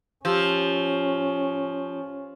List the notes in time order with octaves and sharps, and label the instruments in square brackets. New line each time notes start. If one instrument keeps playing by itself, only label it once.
[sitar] F3 [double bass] C#4 [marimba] G4 E6